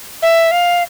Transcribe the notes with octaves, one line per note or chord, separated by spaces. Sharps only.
E5
F5